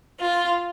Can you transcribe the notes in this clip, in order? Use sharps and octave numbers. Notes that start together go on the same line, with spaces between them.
F4